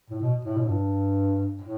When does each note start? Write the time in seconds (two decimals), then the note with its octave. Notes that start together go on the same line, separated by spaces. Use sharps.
0.10 A2
0.21 B2
0.45 A2
0.57 B2
0.63 A2
0.69 G2
1.62 A2